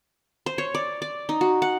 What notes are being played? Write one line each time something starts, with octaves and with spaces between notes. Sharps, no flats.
C5
C#5
D5
D5
D#4
F#4
F#5